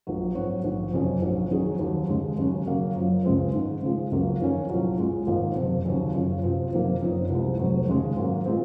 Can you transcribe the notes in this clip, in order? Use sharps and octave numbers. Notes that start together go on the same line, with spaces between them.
A#1 A#2 F#3
G#2 F#3 C4 F#4 C#5
A#1 G#2 D#3
F#1 F2 C3 F#3 C#4
A#1 G#2 F#3
F2 D#3 F#3 C#4 G#4
D#2 D#3 F#3
D#2 C#3 G#3 D#4
D#2 C#3 F#3 C#4 F#4
C#3 F#3 A#3
F#1 F#2 F3
C#2 C#3 G#3 C4
G#2 D#3 G#3
C#3 F3 G#3
C#2 C#3 F#3 A#3
F2 D#3 A#3 C#4
C2 A#2 F#3
A#2 G#3 C#4
G#1 G#2 F3 A#3 D#4
F#1 F2 C3
D#2 C#3 F#3 C#4
F#2 C#3 F3
C3 F3 C4 F#4
F#1 F2 C3 D#3 A#3
F#1 F#2 F3 C4 D#4
C2 C3 F3 G#3
F1 F2 C3 F#3
D#2 C#3 G#3
G#2 D#3 F#3 A#3
A#2 G#3 C4